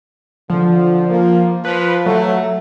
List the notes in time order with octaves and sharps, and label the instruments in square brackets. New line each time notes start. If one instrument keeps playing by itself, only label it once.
[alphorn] D3 [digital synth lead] F3
[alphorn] A#3
[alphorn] F3 [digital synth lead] B4
[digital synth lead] F#3 [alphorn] A3